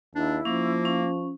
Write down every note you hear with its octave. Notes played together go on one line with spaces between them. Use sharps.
D#2 D4 E4
F3 A#3 C#4
C#4